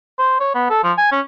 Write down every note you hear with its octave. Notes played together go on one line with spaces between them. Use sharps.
C5
C#5
B3
A4
F3
G#5
C#4